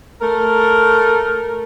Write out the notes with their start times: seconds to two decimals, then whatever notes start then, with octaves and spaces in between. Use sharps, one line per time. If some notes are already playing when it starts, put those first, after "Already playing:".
0.20 A3 A#4